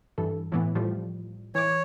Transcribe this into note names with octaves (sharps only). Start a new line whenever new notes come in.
G2 E3 A4
A2 E3 B3
A2 F3 G3
E3 C#5 D6